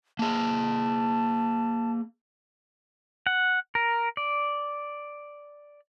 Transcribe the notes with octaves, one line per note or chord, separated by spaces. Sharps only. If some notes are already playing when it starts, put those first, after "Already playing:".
A#3 G#4 A5
F#5
A#4
D5